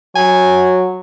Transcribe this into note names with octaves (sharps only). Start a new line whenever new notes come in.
F#3 G#5